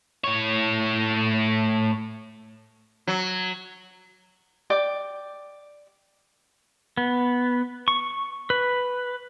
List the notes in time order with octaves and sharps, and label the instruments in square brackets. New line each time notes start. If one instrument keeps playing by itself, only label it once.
[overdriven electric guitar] A2 C#5
[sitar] F#3
[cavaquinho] D5 G5 D6
[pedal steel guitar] B3
C#6
B4